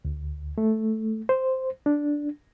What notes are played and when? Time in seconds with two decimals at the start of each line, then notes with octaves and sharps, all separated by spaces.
0.05 D2
0.58 A3
1.29 C5
1.86 D4